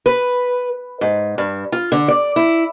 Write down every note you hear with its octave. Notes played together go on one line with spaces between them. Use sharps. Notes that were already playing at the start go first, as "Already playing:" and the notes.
B4
G#2
G2
F4
D3
D5
E4